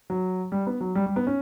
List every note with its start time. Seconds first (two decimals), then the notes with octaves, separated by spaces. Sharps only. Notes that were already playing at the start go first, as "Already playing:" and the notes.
0.10 F#3
0.52 G3
0.67 B3
0.81 F#3
0.95 G3
1.06 G3
1.16 B3
1.27 C#4